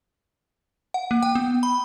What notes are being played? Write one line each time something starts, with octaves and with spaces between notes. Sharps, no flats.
F#5
A#3
G5
B3
B5